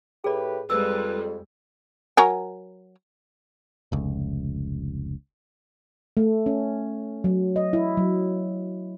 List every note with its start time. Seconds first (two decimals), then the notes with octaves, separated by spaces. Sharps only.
0.24 A2 G4 G#4 B4 D5
0.70 F2 G3 G#3 B4 E6
2.17 F#3 A#4 G#5
3.92 F1 C#2
6.17 A3
6.46 C#4
7.24 F#3
7.56 D#5
7.73 E4
7.97 F#3